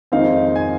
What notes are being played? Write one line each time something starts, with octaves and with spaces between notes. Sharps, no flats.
F2 D#3 G#3 C4 D#4 F5
G#5